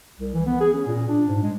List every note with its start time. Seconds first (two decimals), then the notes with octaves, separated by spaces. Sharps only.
0.20 C2
0.34 E3
0.46 B3
0.61 G#4
0.73 C#4
0.87 A#2
1.09 D4
1.28 G#2
1.43 G#3